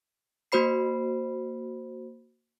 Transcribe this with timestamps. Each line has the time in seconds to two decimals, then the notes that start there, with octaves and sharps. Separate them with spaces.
0.52 A#3 F#4 C5 B5 C7